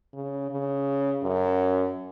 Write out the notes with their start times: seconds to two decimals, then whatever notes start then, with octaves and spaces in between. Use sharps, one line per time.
0.14 C#3
0.51 C#3
1.23 F#2